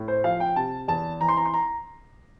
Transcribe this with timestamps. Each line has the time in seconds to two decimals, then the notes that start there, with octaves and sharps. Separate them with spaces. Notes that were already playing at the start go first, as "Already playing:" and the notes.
Already playing: A2
0.08 C5
0.24 F3 F5
0.40 G5
0.56 C3 A5
0.88 E2 A5
1.20 E3 A#5
1.28 C6
1.37 A#5
1.45 C6
1.54 A#5